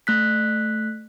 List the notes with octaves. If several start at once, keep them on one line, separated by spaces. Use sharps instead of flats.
A3 F#6 B6